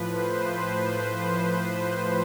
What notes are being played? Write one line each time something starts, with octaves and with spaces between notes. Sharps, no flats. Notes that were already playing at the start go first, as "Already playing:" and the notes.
Already playing: A2 F3 B4
C5
C5